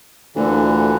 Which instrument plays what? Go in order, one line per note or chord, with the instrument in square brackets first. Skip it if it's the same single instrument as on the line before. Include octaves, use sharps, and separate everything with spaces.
[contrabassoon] D2 [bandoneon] A#2 D3 E3